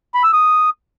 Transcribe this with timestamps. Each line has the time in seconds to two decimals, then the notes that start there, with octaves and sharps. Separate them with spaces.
0.14 B5
0.24 E6
0.33 D#6